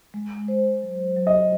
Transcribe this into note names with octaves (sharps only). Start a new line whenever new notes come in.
G#3
C5
F#3
F#3
D#5